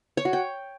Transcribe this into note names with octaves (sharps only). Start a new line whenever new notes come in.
C#5
F#4
G5